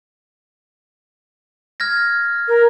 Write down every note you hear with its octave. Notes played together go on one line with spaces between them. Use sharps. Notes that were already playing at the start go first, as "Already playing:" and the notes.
F6 G#6 A#6
A#4